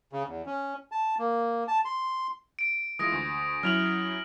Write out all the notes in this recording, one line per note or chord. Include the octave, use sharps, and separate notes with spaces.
C#3
E2
C#4
A5
A#3
A5
C6
D7
E3 G#3 F4 D#6 A#6 D7
D2
F#3 C#4 E4 F6 F7 F#7